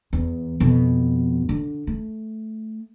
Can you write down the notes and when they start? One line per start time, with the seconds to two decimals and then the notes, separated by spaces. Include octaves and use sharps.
0.13 E2
0.60 F2 B2
1.49 D3
1.87 A3